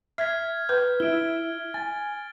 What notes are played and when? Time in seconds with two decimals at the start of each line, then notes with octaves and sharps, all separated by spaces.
0.18 E5 F6 G#6 B6
0.69 B4
1.00 E4 E5 D7 G7
1.74 G#5 A6